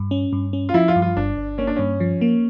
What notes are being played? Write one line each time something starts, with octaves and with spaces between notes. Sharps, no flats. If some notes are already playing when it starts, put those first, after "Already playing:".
Already playing: G2
C#4
G2
C#4
F4
F3 E4
F4
G2
F4
G1 D4
G1
A#3 C#4
D4
G2 C#4
F3
A#3